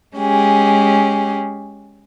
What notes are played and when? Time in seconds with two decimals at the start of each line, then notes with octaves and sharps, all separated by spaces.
0.17 G#3 C#4 G4 G#4